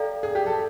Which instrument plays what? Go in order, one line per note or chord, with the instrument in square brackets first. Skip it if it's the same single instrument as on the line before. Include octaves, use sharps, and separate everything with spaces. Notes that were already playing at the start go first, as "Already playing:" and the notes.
Already playing: [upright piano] G4 [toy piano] A4 D5 F5 A#5
[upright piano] G#4
G4
A4